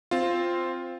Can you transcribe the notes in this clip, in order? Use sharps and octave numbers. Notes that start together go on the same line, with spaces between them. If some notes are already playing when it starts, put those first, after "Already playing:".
C4 F4